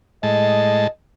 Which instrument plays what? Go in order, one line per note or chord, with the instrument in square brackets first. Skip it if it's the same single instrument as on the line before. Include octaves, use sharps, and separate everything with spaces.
[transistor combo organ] A2 G#3 A5 [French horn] D#5